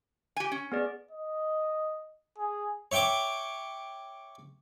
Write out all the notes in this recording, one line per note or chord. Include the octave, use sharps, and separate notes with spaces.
G4 G#5
C#4
B3 G#4 D5
D#5
G#4
C#5 E5 G5 C#6 D6